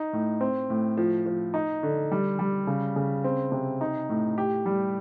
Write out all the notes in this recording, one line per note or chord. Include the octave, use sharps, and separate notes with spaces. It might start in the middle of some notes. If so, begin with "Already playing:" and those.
Already playing: D#4
A2
C4
A2
F3
F3
D#4
D3
G3
G3
C#3
C#3
C4
C3
D#4
A2
G4
G3